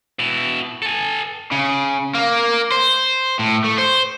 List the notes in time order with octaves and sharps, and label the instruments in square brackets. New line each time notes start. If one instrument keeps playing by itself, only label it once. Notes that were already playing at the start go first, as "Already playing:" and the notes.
[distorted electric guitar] B2 E4
A4 G#5
[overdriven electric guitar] C#3
A#3
C5
A2
A3
C5